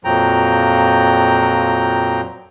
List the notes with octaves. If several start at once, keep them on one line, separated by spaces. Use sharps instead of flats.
F2 A#2 F3 F#3 G5 A#5